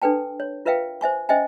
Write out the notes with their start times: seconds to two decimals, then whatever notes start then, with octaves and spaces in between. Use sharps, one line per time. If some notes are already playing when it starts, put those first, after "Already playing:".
0.02 D4 A4 B4 G5 A5
0.40 C#5
0.65 F4 A#4 B4 E5 F5 G5
1.01 C5 E5 G#5 C#6
1.29 C#4 C5 D#5 E5 G5 G#5